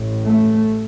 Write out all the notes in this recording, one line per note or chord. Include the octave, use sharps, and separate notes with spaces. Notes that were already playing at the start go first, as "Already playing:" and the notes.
Already playing: A1 A2
A3